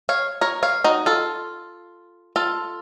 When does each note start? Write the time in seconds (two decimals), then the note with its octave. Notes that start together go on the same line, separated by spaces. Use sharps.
0.09 C#5 F5
0.41 A#4 C#5
0.63 C#5 F5
0.84 D#4 F#4
1.06 F4 A4
2.36 F4 A4